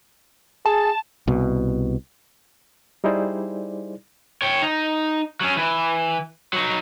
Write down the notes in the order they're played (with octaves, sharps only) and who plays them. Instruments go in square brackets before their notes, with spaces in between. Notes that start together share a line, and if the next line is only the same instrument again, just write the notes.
[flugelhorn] G#4 [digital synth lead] A5
[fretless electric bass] C2 B2
[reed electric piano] G3 D#4 E4 G#4 C5 D5
[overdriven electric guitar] C#5 G5
D#4
F#3 C#4
E3
F#3 D#4